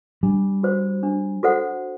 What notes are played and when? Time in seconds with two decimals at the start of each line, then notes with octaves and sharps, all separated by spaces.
0.23 G3 D4
0.63 F#4 C5
1.03 D4
1.43 F#4 A4 C5 F#5